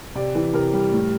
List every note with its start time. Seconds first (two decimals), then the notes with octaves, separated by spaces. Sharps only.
0.15 C3 D5
0.35 E3
0.54 C3 A#4
0.73 G3
0.92 A2